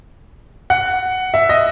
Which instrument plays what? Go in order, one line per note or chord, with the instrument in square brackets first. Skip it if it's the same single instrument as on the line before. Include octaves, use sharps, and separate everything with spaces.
[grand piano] F#5
E5
D#5